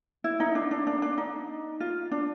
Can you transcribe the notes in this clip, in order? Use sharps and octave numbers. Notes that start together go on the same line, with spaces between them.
E4
D#4
D4
D4
D4
D4
D#4
F4
D4